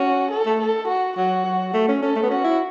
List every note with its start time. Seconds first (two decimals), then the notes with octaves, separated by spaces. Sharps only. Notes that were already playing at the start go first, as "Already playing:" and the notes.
Already playing: C#4 F#4
0.31 A4
0.46 A3
0.60 A4
0.88 F#4
1.17 F#3 F#4
1.45 F#3
1.74 A3
1.88 C#4
2.02 C#4 A4
2.16 A3
2.23 B3
2.30 C#4 F#4
2.44 E4